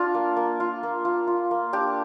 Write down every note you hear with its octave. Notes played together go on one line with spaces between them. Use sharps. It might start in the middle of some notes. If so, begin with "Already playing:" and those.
Already playing: D4 F4
A#3
A#3
F4
A#3
F4
F4
A#3
D4 G4